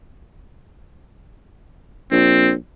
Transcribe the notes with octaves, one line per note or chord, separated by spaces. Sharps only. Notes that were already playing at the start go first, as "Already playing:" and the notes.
A#1 C4